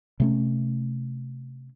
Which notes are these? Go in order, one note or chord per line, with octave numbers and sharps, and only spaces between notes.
C3 A3 C#4